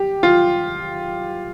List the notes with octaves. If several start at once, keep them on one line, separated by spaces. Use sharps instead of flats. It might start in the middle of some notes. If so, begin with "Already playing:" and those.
Already playing: G4
F4